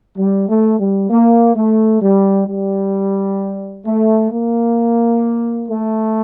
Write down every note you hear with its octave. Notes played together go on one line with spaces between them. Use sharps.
G3
A3
G3
A#3
A3
G3
G3
A3
A#3
A3